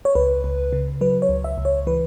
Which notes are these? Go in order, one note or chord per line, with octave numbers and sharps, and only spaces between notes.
C#5
C#2 B4
C#2
C#3
F#3 B4
C#5
C#2
E5
C#2
C#5
E3 B4